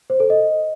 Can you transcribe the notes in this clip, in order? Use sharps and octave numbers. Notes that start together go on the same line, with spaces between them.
C5
A4
D#5